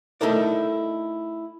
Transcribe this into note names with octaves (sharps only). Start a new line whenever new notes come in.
A3 D#4 E4 A4 A#4 D5